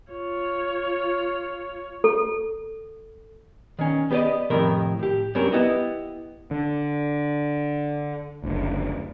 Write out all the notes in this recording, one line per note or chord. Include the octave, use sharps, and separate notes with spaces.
F4 C#5
A4
D#3 C#4
B3 G4 B4 D5 D#5
F2 A2 C3 D#3 A#4 B5
A2 G4
G2 F#3 C4 C#4 A#4
B3 E4 G4 D#5
D3
F#1 D2